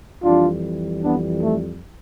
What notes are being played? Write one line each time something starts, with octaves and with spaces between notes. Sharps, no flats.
F2 E3 G3 D4 F4
B3 D4
A3